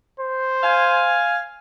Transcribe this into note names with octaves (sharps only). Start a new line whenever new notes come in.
C5
F5 G#5